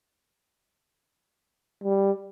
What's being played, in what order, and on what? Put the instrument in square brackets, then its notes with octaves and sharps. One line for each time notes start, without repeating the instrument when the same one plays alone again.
[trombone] G3